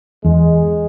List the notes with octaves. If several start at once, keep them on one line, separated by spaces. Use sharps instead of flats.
E2 G#3